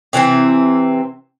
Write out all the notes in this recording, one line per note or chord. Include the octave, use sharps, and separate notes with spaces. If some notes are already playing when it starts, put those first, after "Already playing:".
C3 E3 A3 C4